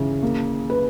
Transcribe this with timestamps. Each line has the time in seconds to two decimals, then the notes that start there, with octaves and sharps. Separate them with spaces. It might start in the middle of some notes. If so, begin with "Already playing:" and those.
Already playing: C#3 E3
0.23 A#3
0.70 B4